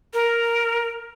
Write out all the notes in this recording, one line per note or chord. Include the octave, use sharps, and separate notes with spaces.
A#4